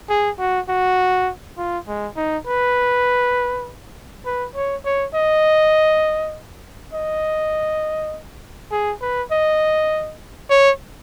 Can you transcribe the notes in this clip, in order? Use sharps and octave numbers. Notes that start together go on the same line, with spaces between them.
G#4
F#4
F#4
F4
G#3
D#4
B4
B4
C#5
C#5
D#5
D#5
G#4
B4
D#5
C#5